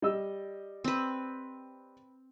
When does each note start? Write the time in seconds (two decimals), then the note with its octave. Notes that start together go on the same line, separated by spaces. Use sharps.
0.02 G3 D#5 E6
0.84 C4 B4